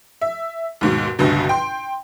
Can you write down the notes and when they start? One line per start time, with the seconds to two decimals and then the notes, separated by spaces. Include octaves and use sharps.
0.21 E5
0.81 D#2 G#2 B2
1.19 G1 C#2 G2 B2
1.49 G5 C6